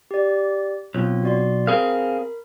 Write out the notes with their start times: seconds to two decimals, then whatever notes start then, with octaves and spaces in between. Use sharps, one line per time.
0.11 G4 D5
0.94 B1 C4 F4 C#5
1.23 F#4 D5 C6
1.67 C4 G#4 A#4 F5 B5